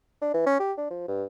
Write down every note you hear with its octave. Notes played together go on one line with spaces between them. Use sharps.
D4
E3
C#4
G4
D4
F3
G2